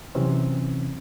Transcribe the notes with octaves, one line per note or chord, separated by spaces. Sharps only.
C3 E3 F#3 C4 C#4